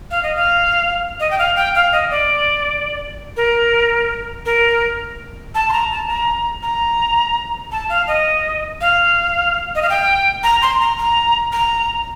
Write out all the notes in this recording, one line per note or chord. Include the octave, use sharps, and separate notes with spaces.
F5
D#5
F5
D#5
G5
F5
G5
F5
D#5
D5
A#4
A#4
A5
C6
A#5
A5
A#5
A#5
A5
F5
D#5
F5
D#5
F5
G5
A#5
C6
A#5
A#5
A#5